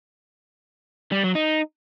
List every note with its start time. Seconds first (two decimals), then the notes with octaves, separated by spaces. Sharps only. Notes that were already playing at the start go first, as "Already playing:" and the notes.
1.12 G3
1.23 F#3
1.35 D#4